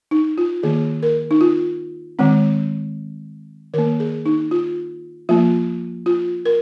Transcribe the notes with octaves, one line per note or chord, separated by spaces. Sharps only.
D#4
F4
D#3 A#3 G#4
A#4
D#4
F4
D#3 G#3 C4
D#3 A#3 A#4
G#4
D#4
F4
F3 A#3 F4
F4
A#4